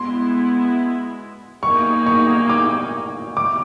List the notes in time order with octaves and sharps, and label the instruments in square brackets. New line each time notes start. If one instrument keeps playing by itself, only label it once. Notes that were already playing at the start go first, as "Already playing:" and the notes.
Already playing: [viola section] G#3 B3 E4 [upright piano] C6
[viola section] A#3 D#4 G#4 [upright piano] C#6
[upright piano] C#6
D6
D6